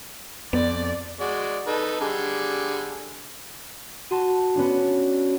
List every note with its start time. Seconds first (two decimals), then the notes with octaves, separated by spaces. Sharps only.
0.53 F2 B3 D5
1.20 G#3 F#4 D5
1.67 D#4 A4 B4
2.00 D3 G3 G#4
4.11 F#4 A5 C6 D#7
4.55 B3 C#4 D4